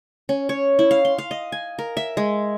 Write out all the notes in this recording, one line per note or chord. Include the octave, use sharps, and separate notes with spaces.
C#4
C#5
E4
F5
C6
F5
D#5
G#5
A#4
E5
G#3